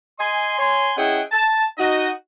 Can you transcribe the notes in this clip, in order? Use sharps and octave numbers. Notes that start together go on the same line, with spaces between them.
D#5 G#5 C6
C#5 G#5 C6
C#4 E4 G#4 D#5 F#5 G5
A5
D#4 F#4 D#5